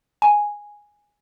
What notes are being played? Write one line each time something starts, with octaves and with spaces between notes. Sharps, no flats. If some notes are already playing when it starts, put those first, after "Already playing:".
G#5